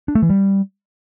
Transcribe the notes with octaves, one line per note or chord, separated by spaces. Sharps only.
D4
A3
E3
G3